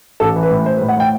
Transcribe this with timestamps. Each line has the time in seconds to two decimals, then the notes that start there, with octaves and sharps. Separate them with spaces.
0.20 A1 A4
0.36 E3
0.43 B4
0.51 A2
0.66 A2 C5
0.77 B4
0.81 A2
0.88 F#5
0.97 A2 G5